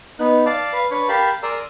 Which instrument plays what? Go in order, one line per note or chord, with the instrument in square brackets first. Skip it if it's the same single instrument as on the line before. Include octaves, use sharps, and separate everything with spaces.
[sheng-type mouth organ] B3 D#4 F#6
D5 F5 A5
B4 F5
D4 B4 C#5
G4 A#4 F5 A5 B5
G#4 A#4 D5 A#5 C6 E6